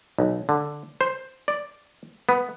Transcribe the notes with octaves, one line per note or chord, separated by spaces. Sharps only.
B1
D3
C5
D5
B3